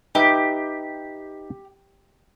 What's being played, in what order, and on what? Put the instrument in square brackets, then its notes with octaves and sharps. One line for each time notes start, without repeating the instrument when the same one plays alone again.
[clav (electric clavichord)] D#4 B4 E5 [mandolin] G4